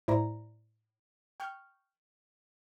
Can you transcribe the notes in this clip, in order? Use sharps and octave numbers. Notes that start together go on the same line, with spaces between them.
A2 E4 C5 D5 A#5
G5 C#6 F6 G6